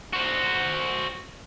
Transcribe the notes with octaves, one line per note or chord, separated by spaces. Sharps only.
F#4 C5